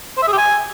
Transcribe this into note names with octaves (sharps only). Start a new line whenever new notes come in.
C5
E5
G#4
G4
G#5